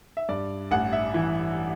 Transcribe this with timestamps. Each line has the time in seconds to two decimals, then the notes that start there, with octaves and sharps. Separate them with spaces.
0.17 E5
0.29 G2 D5
0.71 A1 F#5
0.93 E5
1.14 E3